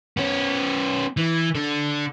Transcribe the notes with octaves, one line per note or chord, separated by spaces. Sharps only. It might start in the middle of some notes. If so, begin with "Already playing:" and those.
B3 C#4
E3
D3 D4